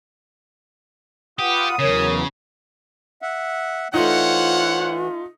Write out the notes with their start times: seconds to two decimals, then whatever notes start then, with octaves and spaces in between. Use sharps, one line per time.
1.39 F4 G4 B4 F#5 D#6
1.79 E2 C#3 E3 F#3 A#4 C#5
3.22 E5 F#5
3.94 E3 A3 D#4 F4 C5 C#5 F#5